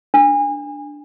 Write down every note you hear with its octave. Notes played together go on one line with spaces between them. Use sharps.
D4